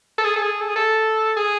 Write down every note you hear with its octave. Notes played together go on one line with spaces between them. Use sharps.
A4
G#4
A4
G#4
A4
G#4
A4
G#4